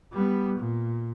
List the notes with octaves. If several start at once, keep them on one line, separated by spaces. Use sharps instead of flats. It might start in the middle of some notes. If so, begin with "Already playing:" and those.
G3 B3
A#2